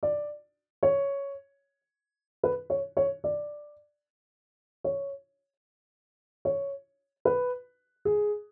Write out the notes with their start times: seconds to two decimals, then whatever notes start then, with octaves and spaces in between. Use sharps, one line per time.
0.03 D5
0.83 C#5
2.43 B4
2.70 C#5
2.97 C#5
3.24 D5
4.84 C#5
6.45 C#5
7.25 B4
8.05 G#4